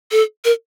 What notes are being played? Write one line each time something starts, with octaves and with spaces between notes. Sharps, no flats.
A4
A#4